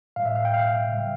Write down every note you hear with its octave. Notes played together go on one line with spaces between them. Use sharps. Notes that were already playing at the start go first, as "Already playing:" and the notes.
A2 G3 F5
E5
F5
G5
F5
C#3 G3